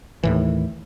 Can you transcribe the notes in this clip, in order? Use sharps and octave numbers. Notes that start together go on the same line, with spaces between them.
D#2 A2 E3